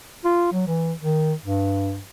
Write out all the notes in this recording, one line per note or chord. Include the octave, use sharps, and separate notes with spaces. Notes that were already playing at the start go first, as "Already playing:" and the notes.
F4
F#3
E3
D#3
G2